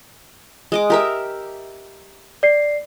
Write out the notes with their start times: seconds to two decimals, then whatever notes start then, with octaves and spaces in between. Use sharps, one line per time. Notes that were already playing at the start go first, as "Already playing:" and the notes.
0.72 G#3 D#5 D6
0.90 G4 A#4 E5
2.43 D5 C7